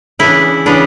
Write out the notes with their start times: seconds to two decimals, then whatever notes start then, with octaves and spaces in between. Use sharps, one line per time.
0.19 C#3 E3 B3 D4 E4
0.66 C#3 E3 B3 D4